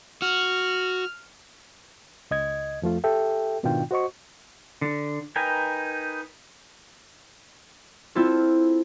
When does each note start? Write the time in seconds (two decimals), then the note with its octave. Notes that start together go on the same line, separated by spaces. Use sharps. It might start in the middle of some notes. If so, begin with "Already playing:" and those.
0.22 F#4 F6
2.31 C#2 D#5 G#6
2.82 F2 F3 A3 F4
3.04 G4 A4 E5 G5
3.63 G#2 B2 D#3 D4 F4 G5
3.91 F#4 C5 D#5 C#6
4.81 D3
5.36 D#4 A#4 B4 G5 G#5
8.15 C4 E4 F4 A4